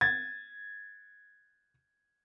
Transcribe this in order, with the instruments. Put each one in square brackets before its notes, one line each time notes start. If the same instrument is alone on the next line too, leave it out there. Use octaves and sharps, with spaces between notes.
[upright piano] G#6 A6